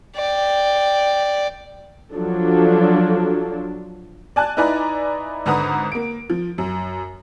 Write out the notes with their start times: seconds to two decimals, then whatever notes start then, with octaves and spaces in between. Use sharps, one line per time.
0.16 D5 G5
2.15 F3 F#3 D4 A4
4.36 D5 G#5 A5 F#6
4.57 D#4 E4 B4 D5 G#5 A#5
5.46 G#1 D3 B4 F#5 A#5 D#6
5.92 A#3 D7
6.30 F3
6.58 F#2